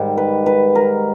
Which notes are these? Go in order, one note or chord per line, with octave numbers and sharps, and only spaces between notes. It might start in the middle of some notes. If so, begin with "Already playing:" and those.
Already playing: G#2 D#3 G3
B4
B4
A#4